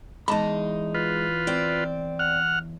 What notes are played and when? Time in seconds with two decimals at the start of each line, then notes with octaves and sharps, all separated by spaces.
0.28 E2 G#3 D#4 A5 B5
0.94 F4 B4
1.47 C4 D5
2.19 F#5 F6